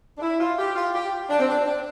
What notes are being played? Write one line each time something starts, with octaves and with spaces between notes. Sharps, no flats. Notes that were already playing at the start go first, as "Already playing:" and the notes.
D4
E4
F4
G4
F4
G4
D4
C4
D4
D4